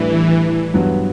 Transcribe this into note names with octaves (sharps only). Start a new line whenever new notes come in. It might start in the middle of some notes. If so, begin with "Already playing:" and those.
Already playing: A2 E3 G3 D4 G4
G2 F#3 B3